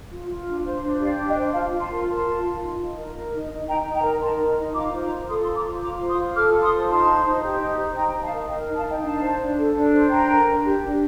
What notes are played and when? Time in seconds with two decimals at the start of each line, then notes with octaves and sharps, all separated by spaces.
0.11 F4
0.29 F4
0.47 D4
0.64 C5
0.82 D4
1.00 G4 D5 F5
1.18 D4
1.27 D#5 G5
1.35 C5
1.53 F4 F5 A5
1.71 F4
1.80 A5 C6
1.89 A#4
2.07 A#4 A5 C6
2.25 F4
2.43 F4
2.61 D#4
2.79 D#4
2.96 A#4
3.14 A#4
3.32 D#4
3.50 D#4
3.67 D#4 G5 A#5
3.86 D#4
3.95 G5 A#5
4.03 A#4
4.21 A#4 A5 C6
4.39 D#4
4.57 D#4
4.75 F4 A#5 D6
4.93 C5
5.01 A#5 D6
5.11 F4
5.28 A4 C6 D#6
5.42 C6 D#6
5.46 F4
5.55 A#5 D6
5.65 C5
5.82 F4 A#5 D6
6.00 C5
6.09 C6 D#6
6.18 F4
6.35 A4 D6 F6
6.53 F4
6.62 C6 D#6
6.71 C5
6.89 D#4 A5 C6
7.07 C5
7.25 D#4
7.43 G4
7.60 D#4
7.78 C5
7.96 D#4 G5 A#5
8.14 D#4
8.23 F5 A5
8.32 A#4
8.50 A#4 D#5 G5
8.68 D#4
8.76 F5 A5
8.85 D#4 D#5 G5
9.03 D4 F5 A5
9.21 C5
9.39 D4
9.57 A4
9.75 D4
9.93 C5
10.10 D4 G5 A#5
10.28 A#4
10.46 D4
10.64 G4
10.82 D4